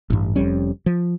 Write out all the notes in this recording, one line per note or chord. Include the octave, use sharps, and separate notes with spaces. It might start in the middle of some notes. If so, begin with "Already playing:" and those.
A1 G2
F1 F2 G3 C#4
F3